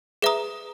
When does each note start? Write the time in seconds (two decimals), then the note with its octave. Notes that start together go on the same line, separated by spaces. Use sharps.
0.22 G#4 B4 E5 A#5 D#6